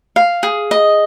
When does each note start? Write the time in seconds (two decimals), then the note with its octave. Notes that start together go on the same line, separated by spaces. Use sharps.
0.16 F5
0.43 G#4
0.71 D#5